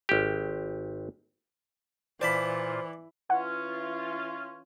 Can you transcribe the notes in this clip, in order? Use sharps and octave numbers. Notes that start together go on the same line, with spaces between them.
G#1 G4
A#2 E3 F4 C5 D5 A5 B5
E3 C#4 F4 F#5